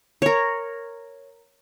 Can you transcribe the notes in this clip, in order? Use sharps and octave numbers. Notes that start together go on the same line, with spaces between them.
A#4 C#5